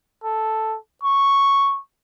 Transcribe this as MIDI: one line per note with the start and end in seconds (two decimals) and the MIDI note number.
0.24 0.77 69
1.04 1.79 85